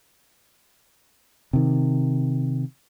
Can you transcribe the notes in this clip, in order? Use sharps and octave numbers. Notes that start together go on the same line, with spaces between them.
C3 D#3